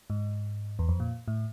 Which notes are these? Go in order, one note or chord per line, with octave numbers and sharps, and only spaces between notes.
G#2
E2
F2
A#2
A2